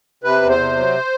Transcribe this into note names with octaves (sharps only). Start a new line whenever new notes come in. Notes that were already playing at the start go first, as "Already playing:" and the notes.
C3 B4
E2
C5
C3
F#3